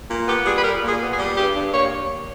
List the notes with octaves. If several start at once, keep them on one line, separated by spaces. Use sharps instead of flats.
A#2
B3 G4
G3 G#4
B4
A#2 A#4
A#2
G#4
B3
G#4
G3
G2 G4
G2
A#3 C#5